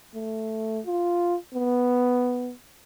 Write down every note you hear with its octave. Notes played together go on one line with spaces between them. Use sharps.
A3
F4
B3